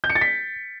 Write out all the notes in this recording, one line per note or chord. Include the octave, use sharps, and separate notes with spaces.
G6
C#7
A6
B6